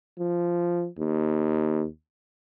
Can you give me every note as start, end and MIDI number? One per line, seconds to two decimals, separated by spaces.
0.19 0.87 53
0.98 1.85 39